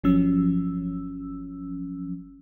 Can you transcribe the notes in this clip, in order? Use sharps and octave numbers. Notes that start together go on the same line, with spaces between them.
G1 F3 F#3 C#4 E6